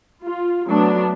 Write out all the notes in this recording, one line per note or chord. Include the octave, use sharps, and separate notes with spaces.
F4
F#3 A3 B3 D4